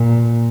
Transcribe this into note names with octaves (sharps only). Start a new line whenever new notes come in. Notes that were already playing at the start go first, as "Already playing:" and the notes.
Already playing: A#2